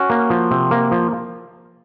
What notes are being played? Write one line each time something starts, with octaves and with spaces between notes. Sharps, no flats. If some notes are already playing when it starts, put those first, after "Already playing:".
Already playing: C#4 F#4
A#3
F3
C3
A#3
F3